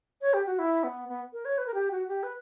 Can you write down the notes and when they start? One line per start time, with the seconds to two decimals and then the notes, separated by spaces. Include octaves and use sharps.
0.21 C#5
0.33 G4
0.46 F#4
0.59 E4
0.83 B3
1.09 B3
1.33 A#4
1.45 C#5
1.58 B4
1.66 A#4
1.74 G4
1.91 F#4
2.08 G4
2.23 B4